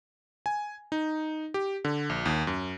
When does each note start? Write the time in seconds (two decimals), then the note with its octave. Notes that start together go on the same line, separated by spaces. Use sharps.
0.46 G#5
0.92 D#4
1.54 G4
1.85 D3
2.10 A#1
2.26 D#2
2.47 F#2